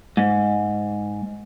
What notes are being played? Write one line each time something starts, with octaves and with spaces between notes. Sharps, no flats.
G#2